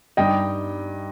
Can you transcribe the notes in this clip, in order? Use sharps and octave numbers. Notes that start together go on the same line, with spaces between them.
G2 G3 D#4 D#5 G5